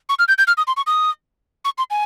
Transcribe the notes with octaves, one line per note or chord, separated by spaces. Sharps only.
C#6
F6
G6
G6
F6
D#6
C6
C#6
D#6
C#6
C6
G#5